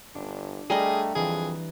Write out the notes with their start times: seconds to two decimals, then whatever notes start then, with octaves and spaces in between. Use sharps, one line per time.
0.15 G1 D4
0.70 G3 A3 G4 G#4 D#5 A#5 D#6 F6
1.15 F2 E3 G#4